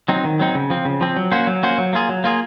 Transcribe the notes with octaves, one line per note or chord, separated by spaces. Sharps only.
F#3 C4 D#4
D#3
F#3 C4 D#4
C#3
F3 C4
C#3
F3 C4
F#3
A#3 C#4 F#4 C5
F#3
A#3 C#4 F#4 C5
F#3
A#3 F4 G#4
F#3
A#3 F4 G#4